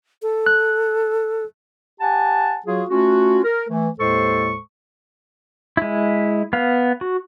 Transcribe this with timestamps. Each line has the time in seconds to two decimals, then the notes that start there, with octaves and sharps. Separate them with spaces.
0.22 A4
0.46 F#6
2.00 G4 F#5 G#5 A5
2.67 F#3 F4 F#4 G#4
2.89 A3 C#4 F4 F#4
3.44 A#4
3.69 E3 A3
3.99 D#2 A2 G#3 A4 C5 C#6
5.77 G#3 E4
6.53 B3 F5
7.01 F#4